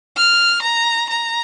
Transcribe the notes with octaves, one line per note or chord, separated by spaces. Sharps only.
F6
A#5
A#5